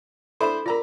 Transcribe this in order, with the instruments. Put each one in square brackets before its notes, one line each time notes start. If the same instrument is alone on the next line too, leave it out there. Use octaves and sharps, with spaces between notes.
[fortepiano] D4 E4 C5 [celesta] A4 B5 E7
[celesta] F4 A#4 [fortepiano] D5 A#5 B5